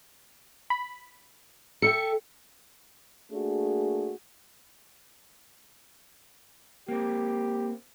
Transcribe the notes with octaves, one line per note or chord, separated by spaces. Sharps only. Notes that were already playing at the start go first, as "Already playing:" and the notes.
B5
A4 E5 G5 C#7
A3 A#3 D4 F#4 G#4
A#3 C4 G4